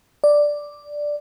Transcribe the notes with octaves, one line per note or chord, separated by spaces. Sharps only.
D5